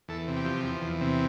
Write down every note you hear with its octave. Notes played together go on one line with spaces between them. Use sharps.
E2 A4
C3
G4
F3
E2
E2
C3